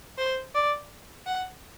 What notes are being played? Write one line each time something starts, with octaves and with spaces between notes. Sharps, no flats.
C5
D5
F#5